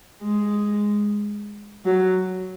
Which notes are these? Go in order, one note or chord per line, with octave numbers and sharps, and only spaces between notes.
G#3
F#3